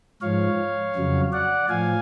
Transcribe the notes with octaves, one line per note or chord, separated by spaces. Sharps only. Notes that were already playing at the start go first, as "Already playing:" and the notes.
G#2 F3 C#5 F5
F2 C#3 F#3
D5 F#5
A2 F3 F5 G#5